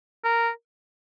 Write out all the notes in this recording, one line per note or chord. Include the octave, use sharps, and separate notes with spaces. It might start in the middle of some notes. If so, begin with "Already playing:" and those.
A#4